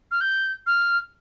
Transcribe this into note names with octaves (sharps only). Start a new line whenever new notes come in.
F6
G6
F6